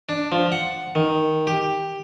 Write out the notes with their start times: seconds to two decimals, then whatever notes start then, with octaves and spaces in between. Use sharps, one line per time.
0.09 D4
0.32 F3
0.52 F#5
0.95 D#3
1.47 G4